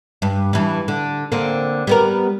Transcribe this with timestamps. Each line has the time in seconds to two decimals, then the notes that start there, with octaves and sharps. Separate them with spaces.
0.22 G2
0.53 G2 E3
0.88 D3
1.32 D3 A#3 C4
1.87 G3 B3 A#4